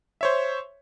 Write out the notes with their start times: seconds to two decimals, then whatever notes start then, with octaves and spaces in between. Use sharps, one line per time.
0.21 C5 C#5 E5